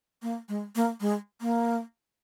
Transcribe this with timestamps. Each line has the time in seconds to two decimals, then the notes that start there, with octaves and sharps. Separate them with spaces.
0.22 A#3
0.49 G#3
0.75 A#3
1.01 G#3
1.41 A#3